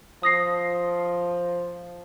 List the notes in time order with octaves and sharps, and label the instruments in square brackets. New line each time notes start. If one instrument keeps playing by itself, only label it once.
[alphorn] F3 [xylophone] D#6 A#6 C7